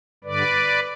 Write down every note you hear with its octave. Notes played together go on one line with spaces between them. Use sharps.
G2 D3 B4 D5